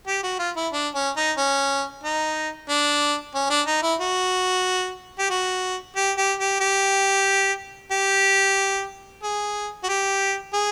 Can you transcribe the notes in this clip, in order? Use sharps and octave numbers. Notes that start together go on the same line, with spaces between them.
G4
F#4
F4
E4
D4
C#4
D#4
C#4
D#4
D4
C#4
D4
D#4
E4
F#4
G4
F#4
G4
G4
G4
G4
G4
G#4
F#4
G4
G#4